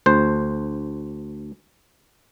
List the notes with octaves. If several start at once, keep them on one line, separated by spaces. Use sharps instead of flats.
D2 C5